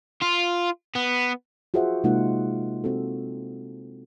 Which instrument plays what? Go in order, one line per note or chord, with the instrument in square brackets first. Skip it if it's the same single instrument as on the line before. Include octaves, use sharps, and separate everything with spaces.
[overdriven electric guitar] F4
B3
[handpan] F4 F#4 G#4 C5 E5 F#5
C3 G#3 A#3 D#4 F4 F#5
C4 F#4 A4